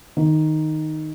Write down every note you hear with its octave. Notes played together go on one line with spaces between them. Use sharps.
D#3